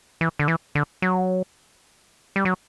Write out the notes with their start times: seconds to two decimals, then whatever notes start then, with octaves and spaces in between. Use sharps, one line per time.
0.21 E3
0.39 D3
0.48 E3
0.75 D3
1.02 F#3
2.36 G3
2.45 F#3